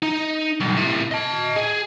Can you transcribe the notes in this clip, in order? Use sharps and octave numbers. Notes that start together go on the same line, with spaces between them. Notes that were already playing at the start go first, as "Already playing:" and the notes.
D#4
B1 G2
A2 C3
D#5 A5
G#4